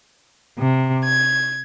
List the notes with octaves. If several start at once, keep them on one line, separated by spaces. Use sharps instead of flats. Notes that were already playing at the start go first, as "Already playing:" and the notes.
C3
G#6